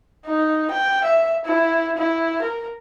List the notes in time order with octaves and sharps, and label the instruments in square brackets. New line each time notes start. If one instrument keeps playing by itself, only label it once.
[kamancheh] D#4
G5
E5
E4
E4
A#4